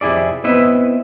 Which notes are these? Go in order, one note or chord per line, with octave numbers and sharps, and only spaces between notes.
F2 C3 E4 G#4 D5
B3 C4 E4 B4 D#5 E5